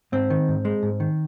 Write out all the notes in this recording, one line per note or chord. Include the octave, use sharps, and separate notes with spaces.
G#2 C4
D#3
G#2
G#3
G#2
D#3